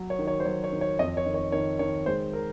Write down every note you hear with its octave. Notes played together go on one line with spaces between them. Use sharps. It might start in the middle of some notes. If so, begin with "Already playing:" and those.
Already playing: F#3
C#5
D#3
C#5
C5
F#3 C#5
C#5
D#3
C#5
F2 D#5
C#5
D#3
C#5
D#3 C#5
D#3 C#5
G#3 C5
A#4